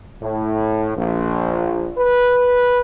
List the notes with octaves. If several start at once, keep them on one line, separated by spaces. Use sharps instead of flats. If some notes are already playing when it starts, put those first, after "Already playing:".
A2
A#1
B4